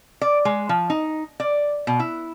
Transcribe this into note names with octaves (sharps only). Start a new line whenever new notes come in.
D5
G#3
F3
D#4
D5
B2
E4